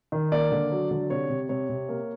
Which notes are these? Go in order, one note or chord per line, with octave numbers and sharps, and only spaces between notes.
D#3
A#3 D5
D3
F#3
D3
C3 C#5
C3
C3 C#5
C3
A#3